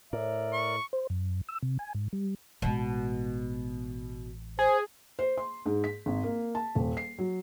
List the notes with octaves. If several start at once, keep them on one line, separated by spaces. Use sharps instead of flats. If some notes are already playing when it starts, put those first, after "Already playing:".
A2 A#4 D5 E5
C#6
C5
F#2
E6
C3
G#5
G#2
G3
A1 B2 G#3
G#4 C5
C5
C6
G#2
B6
G#1
A#3
A5
D#1
C7
F#3